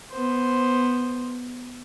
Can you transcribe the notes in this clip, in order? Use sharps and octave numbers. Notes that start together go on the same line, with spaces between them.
B3 C5